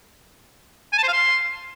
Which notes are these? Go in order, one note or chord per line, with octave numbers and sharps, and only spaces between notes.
G#5
A5
C5
F5
C6